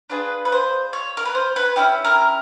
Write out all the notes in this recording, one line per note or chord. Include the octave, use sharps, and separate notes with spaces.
D4 F4 G#4 B4
B4
C5
C#5
A#4
B4
C5
B4
C#4 E4 G4
A#4